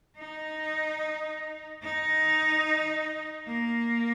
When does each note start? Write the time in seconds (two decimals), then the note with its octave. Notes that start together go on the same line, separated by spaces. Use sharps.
0.17 D#4
1.83 D#4
3.48 A#3